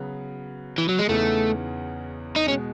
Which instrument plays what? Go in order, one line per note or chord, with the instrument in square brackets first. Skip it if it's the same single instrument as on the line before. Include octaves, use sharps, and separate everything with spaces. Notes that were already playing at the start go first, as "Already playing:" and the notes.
Already playing: [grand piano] C#3 F#3 B3 F#4 B4
[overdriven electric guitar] E3
F#3
G#3
[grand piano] E2 C#3 E3 B3 D#4 [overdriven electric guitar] A3
[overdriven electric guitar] D#4
[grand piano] B2 G#3 [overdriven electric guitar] C#4